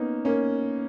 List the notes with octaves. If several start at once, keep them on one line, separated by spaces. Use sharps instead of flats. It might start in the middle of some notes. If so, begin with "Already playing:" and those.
Already playing: A#3 B3 C#4 D#4
A#3 C#4